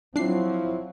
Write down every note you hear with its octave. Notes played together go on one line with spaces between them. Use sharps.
F3 F#3 C4 D4 E4 C7